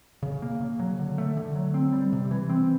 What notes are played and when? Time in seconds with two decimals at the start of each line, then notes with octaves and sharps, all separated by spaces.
0.23 C#3
0.42 A#3
0.61 C#3
0.80 F#3
0.99 D3
1.18 A3
1.37 D3
1.55 F#3
1.74 C4
1.93 G3
2.13 C3
2.31 E3
2.49 C4